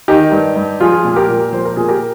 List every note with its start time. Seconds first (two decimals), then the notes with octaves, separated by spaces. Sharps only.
0.08 D#3 D#4 G4
0.32 G2
0.56 G2
0.80 F3 F4 G#4
1.05 A#2
1.16 G4 A#4
1.29 A#2
1.53 F3 C5
1.65 A#4
1.76 A#2 G#4
1.88 G4 A#4